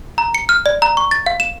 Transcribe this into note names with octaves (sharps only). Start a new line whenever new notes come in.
A#5
C#7
F6
D5
A#5
C#6
A6
F5
E7